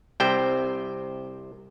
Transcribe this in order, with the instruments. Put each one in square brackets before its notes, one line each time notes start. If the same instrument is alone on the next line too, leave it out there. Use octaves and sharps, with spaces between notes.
[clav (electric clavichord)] C2 C3 C5 G5